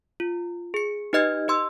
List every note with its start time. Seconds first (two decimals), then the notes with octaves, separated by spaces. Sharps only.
0.20 F4
0.74 G#4 C#7
1.13 D#4 G4 B4 D#5 F6 G#6
1.48 G4 D#5 C6 E6